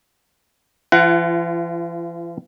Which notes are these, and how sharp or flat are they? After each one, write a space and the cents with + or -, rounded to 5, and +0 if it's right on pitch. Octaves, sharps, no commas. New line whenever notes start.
E3 +45 F4 -30 F#5 +20